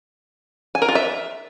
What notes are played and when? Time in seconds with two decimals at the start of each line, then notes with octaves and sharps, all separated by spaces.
0.75 G#5
0.82 A#4
0.89 F4
0.95 E5